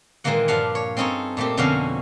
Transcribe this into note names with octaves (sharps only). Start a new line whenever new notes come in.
A#2 D#3 E3 G#3 A#3 F#5
G2 F3 D4 F5 F#5
C#5
C4 C#4 D#4 A4 C#5
A#2 A3 C4 G4
F2 B2 D3 C#4 F#4 F5